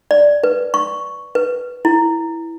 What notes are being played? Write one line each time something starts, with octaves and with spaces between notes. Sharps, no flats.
D5
B4
C#6
B4
E4